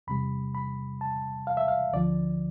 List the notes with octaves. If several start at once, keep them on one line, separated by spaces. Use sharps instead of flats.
E2 C3 G3 B5
B5
A5
F5
E5
F5
D2 D3 F3 D5